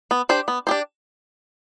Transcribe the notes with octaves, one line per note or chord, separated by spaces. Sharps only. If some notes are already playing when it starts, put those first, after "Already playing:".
B3
D4 G4 C5
B3
D4 G4 C5